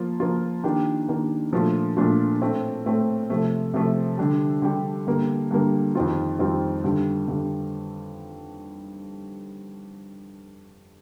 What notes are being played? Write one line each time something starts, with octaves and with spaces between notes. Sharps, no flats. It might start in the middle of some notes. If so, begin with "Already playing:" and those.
Already playing: F3 A#3 F4
F3 A#3 F4
D#3 A#3 D4 G4
D#3 A#3 D4 G4
A#2 F3 A3 D4 F4
A#2 F3 A3 D4 F4
A2 A3 C4
A2 A3 C4
C3 F3 A3
C3 F3 A3
D3 G3 D4 G4
D3 G3 D4 G4
G2 D3 G3 A#3
G2 D3 G3 A#3
F2 D#3 G3 C4 F4
F2 D#3 G3 C4 F4
G2 D3 G3
G2 D3 G3